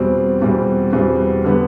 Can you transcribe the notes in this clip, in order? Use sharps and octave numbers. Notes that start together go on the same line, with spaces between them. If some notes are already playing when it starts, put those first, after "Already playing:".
Already playing: E2 B2 G3 C4
E2 B2 G3 C4
E2 B2 G3 C4
D3 G3 B3